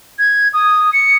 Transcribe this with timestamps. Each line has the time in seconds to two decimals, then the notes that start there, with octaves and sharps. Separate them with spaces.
0.19 G#6
0.54 D#6
0.93 C#7